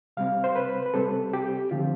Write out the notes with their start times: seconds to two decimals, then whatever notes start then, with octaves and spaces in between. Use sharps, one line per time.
0.17 C3 G3 C4 F5
0.44 C5
0.56 B4
0.86 B4
0.94 C3 G3 C4 A4
1.33 G4
1.71 D3 F3 A3 C4 F4